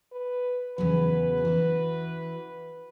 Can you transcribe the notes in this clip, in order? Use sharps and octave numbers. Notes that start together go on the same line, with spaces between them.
B4
E2 C#3 F#3 B4
E3 E4 F#4